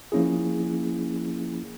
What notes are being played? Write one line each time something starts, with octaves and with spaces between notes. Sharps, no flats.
F3 A#3 C#4 E4 G#4